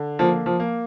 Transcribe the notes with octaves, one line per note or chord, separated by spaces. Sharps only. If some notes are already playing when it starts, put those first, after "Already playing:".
Already playing: D3
F3 A#3
F3
A#3